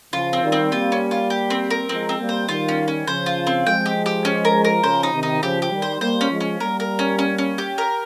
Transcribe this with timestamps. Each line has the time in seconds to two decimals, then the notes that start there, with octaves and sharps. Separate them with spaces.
0.13 C#3 F3 F4
0.33 C4
0.42 D#3 G3
0.52 C4
0.72 G3 A#3 F4
0.92 C#4
1.11 F4
1.30 G4
1.50 C4
1.70 A#4
1.89 F3 G#3 C4
2.09 C4
2.19 G3 A#3
2.29 C5
2.48 D#3 G3 F4
2.68 C#4
2.88 C#4
3.07 C#3 F3 C5
3.26 F4
3.47 C4
3.66 F3 G#3 G5
3.86 G4
4.06 G4
4.25 C#4
4.45 A#4
4.64 A#4
4.83 C#3 F3 C5
5.03 D#4
5.13 C3 D#3
5.23 D#4
5.42 C#3 F3 G4
5.62 G4
5.72 D#3 G3
5.82 C5
6.01 G3 A#3 C5
6.21 C#4
6.31 F3 G#3
6.40 C#4
6.60 G3 A#3 A#4
6.80 A#4
6.99 C#4
7.19 C#4
7.38 C#4
7.58 G4
7.78 A#4